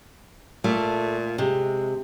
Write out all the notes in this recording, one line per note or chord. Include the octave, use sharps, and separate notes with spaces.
A#2 A3
C3 G#3